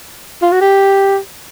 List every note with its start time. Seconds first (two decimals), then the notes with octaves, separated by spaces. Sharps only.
0.42 F4
0.52 F#4
0.61 G4